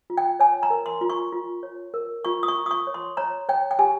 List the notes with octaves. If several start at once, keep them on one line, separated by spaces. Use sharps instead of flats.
F4
G5
C#5 G#5
A#5
A#4
C6
F4
C#6
F4
C#5
A#4
F4 C#6
D#6
C#6
F4
D#6
C#6
C#5
C6
C#5 A#5
C#5 G5
G5
G4 G#5